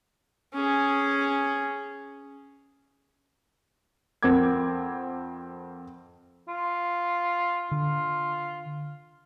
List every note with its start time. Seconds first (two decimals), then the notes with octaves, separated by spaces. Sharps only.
0.54 C#4 G#4
4.23 F2 C4 A#4 F#5 D6 G#6
6.48 F4
7.71 D3 F4